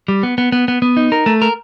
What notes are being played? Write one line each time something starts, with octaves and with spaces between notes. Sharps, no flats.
G3
B3
B3
B3
B3
B3
D#4
A#4
A3
A#4